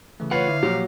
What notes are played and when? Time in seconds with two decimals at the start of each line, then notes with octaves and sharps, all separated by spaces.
0.20 C#3 E3 A3
0.31 F4 B4 C#5 F5 F#5
0.48 D3 E4 E5
0.63 A#2 F3 F#3 A#3 G4